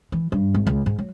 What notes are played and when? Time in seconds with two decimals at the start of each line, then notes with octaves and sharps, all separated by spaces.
0.12 E3
0.32 G2
0.54 G#1
0.67 C#2
0.86 G#2
0.99 F#3